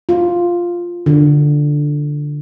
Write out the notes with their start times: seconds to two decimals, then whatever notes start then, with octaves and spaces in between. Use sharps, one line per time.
0.09 F4
1.06 D3